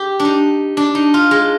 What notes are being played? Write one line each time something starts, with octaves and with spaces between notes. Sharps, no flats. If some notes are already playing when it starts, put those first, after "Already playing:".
Already playing: G4
D4
D#4
D4
D#4
F4
G#3